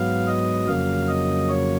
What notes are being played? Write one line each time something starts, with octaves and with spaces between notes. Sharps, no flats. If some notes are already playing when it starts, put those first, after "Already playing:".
Already playing: G#2 F#3 B3 F5
D#5
F2 C#3 F#3 A#3 F5
D#5
C#5